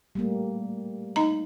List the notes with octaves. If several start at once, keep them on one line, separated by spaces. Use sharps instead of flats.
G3 A3 A#3
D#4 D#5 A#5